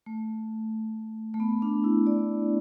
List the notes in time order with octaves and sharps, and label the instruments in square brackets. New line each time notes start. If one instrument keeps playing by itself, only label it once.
[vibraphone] A3
A3
B3
D4
E4
D5